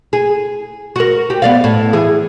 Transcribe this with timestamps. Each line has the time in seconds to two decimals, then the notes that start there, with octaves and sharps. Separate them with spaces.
0.13 G#4
0.96 F#4 A#4
1.30 G4
1.42 B3 D5 F5
1.64 A2
1.93 E3 G#4